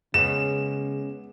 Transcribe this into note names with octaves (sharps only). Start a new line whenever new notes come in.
C#3 G#3 B3 C#4 E7